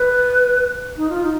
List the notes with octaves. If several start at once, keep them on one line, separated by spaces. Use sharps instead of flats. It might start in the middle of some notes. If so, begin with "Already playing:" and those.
Already playing: B4
D#4
F4
D#4